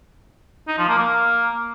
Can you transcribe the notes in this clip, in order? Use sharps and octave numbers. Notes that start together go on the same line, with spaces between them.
D#4
F3
A#3
A#3